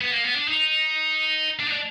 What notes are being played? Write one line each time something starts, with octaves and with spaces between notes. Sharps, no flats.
B3
A#3
B3
D4
D#4
D4
D#4
D4